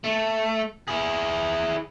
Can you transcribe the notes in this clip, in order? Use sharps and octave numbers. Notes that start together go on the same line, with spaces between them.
A3
E4 G#4